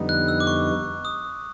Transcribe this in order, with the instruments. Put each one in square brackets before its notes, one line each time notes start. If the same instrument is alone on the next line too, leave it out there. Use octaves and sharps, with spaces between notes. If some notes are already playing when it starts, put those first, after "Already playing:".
Already playing: [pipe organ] F2 D3 G3 B3 D#4
[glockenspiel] F#6
E6
D6
C#6
D#6